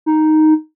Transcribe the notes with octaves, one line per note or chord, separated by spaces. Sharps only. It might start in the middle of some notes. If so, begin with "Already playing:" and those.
D#4